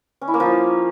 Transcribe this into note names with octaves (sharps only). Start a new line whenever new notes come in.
C#4
E4
A#3
F3